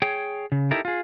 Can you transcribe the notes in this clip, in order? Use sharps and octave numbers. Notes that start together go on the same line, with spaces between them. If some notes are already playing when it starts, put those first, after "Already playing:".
G#4 C#5 G5
C#3
D#4 E4 G4 A4 A#4
F4 G#4